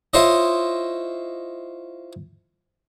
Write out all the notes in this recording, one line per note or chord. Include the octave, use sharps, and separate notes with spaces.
E4 F4 C5 C#5 D#5